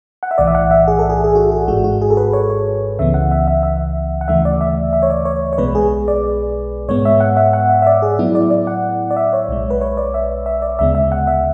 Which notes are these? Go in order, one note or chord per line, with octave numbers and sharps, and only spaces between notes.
F#5
E5
B1 A2 E3 D5
E5
F#5
E5
G#4
A4
G#4
G#4
F#4
G#4
G#1 G#2 G#3 F#4
F#4
G#4
A4
B4
C#5
C#5
C#2 C#3 E3 B3 E5
F#5
E5
E5
E5
F#5
D2 C#3 E3 A3 E5
D5
E5
E5
C#5
D5
C#5
C#5
B1 B2 G#3 B3 B4
G#4
D5
G#2 G#3 B3 C#5
E5
F#5
E5
F#5
E5
E5
D5
G#4
A2 F#3 B3 E4
D5
D5
F#5
D5
E5
C#5
B1 B2 G#3
B4
C#5
D5
E5
E5
D5
D2 C#3 G#3 B3 E5
E5
F#5
E5